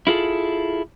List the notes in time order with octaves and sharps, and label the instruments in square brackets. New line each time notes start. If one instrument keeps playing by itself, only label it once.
[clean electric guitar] E4 F4 G#4 A4